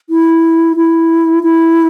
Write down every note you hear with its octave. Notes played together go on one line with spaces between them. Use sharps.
E4
E4
E4